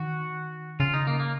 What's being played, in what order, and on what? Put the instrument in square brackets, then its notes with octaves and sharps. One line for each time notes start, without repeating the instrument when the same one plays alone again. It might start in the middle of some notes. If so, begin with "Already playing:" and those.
Already playing: [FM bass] D#3 [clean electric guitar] F#4
[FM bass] C#3 [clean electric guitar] F4
[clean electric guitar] D#4
A#3
A#3